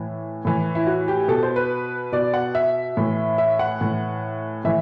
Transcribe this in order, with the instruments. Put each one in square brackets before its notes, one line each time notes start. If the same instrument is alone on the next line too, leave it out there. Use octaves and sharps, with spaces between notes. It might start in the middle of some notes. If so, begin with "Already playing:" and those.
Already playing: [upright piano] A2 E3
A2 E3
E4
F#4
G4
B2 A4
C5
B4
B2 D5
F#5
E5
A2 E3
E5
F#5
A2 E3
A2 E3 E5